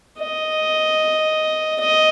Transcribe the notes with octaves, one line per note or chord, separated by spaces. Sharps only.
D#5
D#5